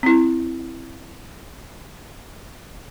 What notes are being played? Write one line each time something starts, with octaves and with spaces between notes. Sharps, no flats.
C4 E4